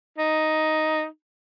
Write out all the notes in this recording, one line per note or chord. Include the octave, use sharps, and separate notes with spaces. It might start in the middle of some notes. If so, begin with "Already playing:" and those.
D#4